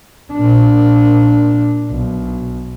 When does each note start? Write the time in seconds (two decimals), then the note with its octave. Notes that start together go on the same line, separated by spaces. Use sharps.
0.32 A#2 D4
1.90 B1